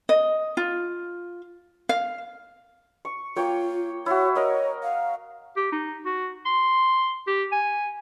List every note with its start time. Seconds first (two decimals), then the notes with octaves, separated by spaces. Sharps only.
0.09 D#5
0.57 F4
1.89 F5
3.05 C#6
3.36 A#3 F4 C#5 G5
4.06 E4 F#4 C#5
4.35 A#4 C#5 D#5
4.83 F5
5.56 G4
5.72 D#4
6.06 F#4
6.46 C6
7.27 G4
7.52 G#5